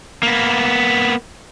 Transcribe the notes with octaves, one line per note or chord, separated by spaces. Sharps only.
A#3 B3